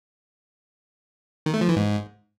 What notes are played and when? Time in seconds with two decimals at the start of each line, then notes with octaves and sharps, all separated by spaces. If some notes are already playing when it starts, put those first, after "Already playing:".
1.46 D#3
1.54 A3
1.61 F3
1.69 E3
1.76 G#2